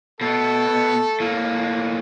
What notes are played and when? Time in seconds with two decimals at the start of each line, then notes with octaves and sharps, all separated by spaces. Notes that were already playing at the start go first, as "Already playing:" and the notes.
0.21 B2 A3 B3 A4
1.20 A2 A#3